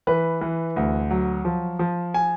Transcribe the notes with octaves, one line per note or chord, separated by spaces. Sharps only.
E3 B4
E3
D2
F#3
F3
F3
G#5